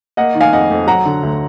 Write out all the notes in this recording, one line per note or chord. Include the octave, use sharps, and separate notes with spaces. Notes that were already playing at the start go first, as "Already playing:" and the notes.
A#3 D#5 F#5
D#3
F5 G#5
F2 D#5 F#5
F2
F#3 F#5 A#5
D3
D2